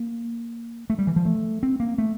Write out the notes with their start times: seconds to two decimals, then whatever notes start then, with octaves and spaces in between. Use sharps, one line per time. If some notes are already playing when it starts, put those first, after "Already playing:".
Already playing: A#3
0.90 A3
0.99 G3
1.07 E3
1.16 F3
1.25 A3
1.63 C4
1.80 A#3
1.98 A3